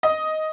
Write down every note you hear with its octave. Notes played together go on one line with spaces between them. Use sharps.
D#5